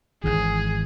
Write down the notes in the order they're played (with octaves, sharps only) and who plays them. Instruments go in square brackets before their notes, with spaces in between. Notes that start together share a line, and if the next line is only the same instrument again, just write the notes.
[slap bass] G#1 G#2 E3 [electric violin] G#4